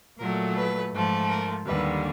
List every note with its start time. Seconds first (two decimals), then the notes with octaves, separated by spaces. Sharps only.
0.19 A#2 F#3 A3 A#4
0.56 B4
0.93 G#2 F3 A3
1.29 A#4
1.66 D#2 D3 G3 B4